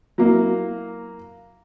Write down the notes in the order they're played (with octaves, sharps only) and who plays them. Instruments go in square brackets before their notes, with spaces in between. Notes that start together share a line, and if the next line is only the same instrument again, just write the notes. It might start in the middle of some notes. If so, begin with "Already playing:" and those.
[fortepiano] F#3 A#3 E4